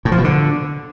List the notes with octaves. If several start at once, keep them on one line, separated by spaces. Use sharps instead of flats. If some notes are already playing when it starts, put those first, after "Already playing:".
A2
F3
B2
D3